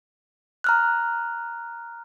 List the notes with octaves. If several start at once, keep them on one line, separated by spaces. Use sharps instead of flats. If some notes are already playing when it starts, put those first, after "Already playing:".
A#5 F6 F#6